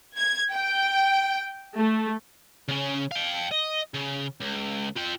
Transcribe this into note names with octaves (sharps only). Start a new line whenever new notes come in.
G#6
G5
A3
C#3 C#4
F5 G5
D#5
C#3
C#2
F4 G5